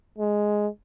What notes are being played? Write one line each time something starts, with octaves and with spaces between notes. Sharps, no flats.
G#3